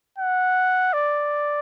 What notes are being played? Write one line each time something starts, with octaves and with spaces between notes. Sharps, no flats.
F#5
D5